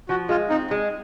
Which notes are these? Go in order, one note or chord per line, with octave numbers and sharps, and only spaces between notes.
F3 F#4
G#3 F4
C4 D#4
G#3